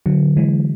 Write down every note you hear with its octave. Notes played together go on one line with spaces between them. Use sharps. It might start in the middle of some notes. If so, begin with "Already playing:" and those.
D3 F#3
E3 G#3